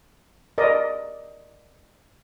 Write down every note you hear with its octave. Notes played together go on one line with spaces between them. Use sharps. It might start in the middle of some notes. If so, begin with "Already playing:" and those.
A#4 D5 D#5